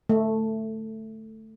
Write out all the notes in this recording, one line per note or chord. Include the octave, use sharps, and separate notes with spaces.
A3